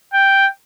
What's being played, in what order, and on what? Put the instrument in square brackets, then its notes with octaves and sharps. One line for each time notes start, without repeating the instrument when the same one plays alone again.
[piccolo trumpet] G5